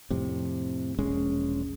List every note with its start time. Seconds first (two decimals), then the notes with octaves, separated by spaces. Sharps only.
0.10 F2 A2 C3
0.99 E1 A#1 G#3 C#4